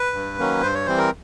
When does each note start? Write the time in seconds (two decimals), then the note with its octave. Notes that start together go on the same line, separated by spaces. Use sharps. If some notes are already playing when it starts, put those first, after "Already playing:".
Already playing: B4
0.13 G2
0.38 D#3 F#3 A#3 C#4
0.62 G2 C5
0.74 C#5
0.86 E3 G3 C4 C5
0.98 A#4